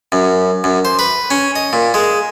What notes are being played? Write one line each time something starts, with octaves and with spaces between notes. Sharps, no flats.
F#2
F#2
C5
B4
C#4
D#5
A#2
G#3